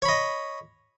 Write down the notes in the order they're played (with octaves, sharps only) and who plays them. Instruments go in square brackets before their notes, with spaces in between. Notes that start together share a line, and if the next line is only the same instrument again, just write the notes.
[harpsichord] C#5
B5
D#5